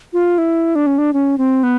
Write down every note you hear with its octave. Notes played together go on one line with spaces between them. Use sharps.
F4
E4
D4
C#4
D4
C#4
C4
B3